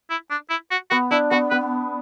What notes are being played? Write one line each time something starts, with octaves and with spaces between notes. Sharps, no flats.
E4
D4
E4
F#4
B3 F#4
D4 E4
B3 F#4
B3 B4